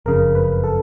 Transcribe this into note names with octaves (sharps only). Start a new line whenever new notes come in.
F#1 F2 C#3 A#4
B4
A4